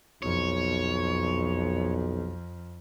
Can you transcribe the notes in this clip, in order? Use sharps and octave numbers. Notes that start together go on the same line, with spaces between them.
B1 F2 C#5